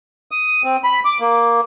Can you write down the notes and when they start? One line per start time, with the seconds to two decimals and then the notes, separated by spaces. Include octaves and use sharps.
0.31 D#6
0.64 C4
0.84 B5
1.05 D6
1.20 A#3